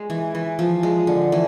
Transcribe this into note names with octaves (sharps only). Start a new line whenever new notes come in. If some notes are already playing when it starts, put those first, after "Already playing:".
Already playing: G#3
E3
E3
F3
G#3
D3
E3